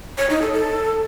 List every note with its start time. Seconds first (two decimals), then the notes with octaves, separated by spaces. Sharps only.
0.18 C#5
0.30 D#4
0.42 A4
0.53 A4